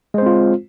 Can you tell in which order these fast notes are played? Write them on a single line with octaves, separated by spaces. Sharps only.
G#3 C5 C4 F4